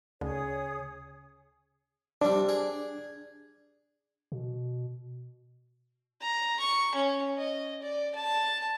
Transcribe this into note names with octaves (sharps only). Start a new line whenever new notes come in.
D2 C#3 G#4 C#5 D#6
C3 G3 D4
G#4
B2
A#5
C#6
C#4
D#5
D5
A5